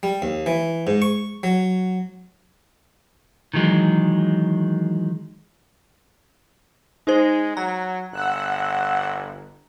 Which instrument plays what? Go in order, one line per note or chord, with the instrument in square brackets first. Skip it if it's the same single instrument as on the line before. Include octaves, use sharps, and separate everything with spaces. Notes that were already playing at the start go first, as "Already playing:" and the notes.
[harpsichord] G3
D#2
E3
G#2
C#6
F#3
[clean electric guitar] D#3 E3 F#3 G#3
[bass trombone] G#3 [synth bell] D#4 G#4 C5
[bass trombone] F#3 [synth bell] A#5
[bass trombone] G1 [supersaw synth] F#5 E6 F#6